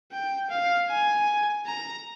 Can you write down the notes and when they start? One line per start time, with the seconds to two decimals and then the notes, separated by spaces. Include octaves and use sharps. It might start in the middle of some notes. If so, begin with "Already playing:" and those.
0.12 G5
0.50 F5
0.89 G#5
1.66 A#5